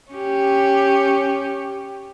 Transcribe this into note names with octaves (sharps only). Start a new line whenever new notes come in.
C#4 G4